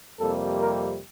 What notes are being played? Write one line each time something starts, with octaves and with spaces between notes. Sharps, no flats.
F2 C3 G3 A#3 A4
A#4